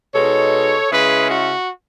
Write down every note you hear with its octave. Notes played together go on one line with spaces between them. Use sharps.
B2 G#3 D#4 A4 C#5
C#3 G#3 C#4 E4 G#4 B4
F#4